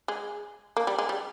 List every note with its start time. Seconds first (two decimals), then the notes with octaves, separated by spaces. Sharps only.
0.08 G#3
0.77 A#3
0.87 G3
0.98 G#3
1.09 G3